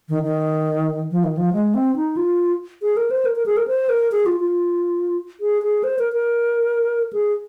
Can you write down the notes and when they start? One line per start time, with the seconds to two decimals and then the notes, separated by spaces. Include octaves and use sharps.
0.09 D#3
0.23 D#3
1.11 F3
1.24 D#3
1.37 F3
1.53 G#3
1.75 C4
1.96 D#4
2.17 F4
2.82 G#4
2.97 A#4
3.11 C5
3.25 A#4
3.36 A#4
3.46 G#4
3.57 A#4
3.68 C5
3.89 A#4
4.12 G#4
4.26 F4
4.40 F4
5.41 G#4
5.63 G#4
5.84 C5
5.99 A#4
6.13 A#4
7.13 G#4